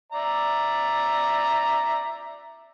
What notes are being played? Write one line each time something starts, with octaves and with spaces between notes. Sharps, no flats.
D5 E5 A#5